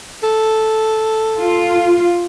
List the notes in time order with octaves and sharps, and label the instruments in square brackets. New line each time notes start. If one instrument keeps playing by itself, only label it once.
[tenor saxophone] A4
[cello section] F4